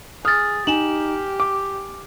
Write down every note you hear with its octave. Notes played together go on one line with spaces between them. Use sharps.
G#4 D#6 F6 A6
D#4 G4 G#5 E7 F#7
D6